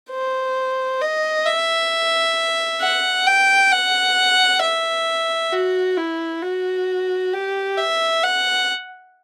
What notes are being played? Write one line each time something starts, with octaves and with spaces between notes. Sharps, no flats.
C5
D#5
E5
F#5
G5
F#5
E5
F#4
E4
F#4
G4
E5
F#5